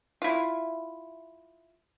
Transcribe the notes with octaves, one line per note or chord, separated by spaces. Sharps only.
E4 F4